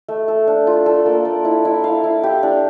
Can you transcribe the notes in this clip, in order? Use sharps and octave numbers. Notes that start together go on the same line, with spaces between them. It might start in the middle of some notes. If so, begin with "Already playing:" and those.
A3
A4
D4
F4
A4
A#3
D5
E4
E4
F5
E4
G4
D4